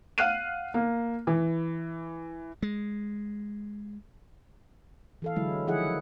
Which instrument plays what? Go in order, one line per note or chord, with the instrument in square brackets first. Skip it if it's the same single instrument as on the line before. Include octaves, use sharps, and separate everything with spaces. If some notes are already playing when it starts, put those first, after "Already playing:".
[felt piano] F5 F#5 F6 F#6 C7 D#7
A#3
E3
[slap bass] G#3
[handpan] E3 A4 F5
D3 E3 F#3 G#3 E4
D#3 F3 E4 G#4 E5 F#5